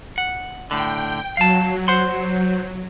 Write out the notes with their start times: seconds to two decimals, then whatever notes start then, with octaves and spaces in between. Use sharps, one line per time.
0.18 F#5
0.71 A2 D3 G5
1.37 F#3 F5 A5
1.88 C5 F#5 C6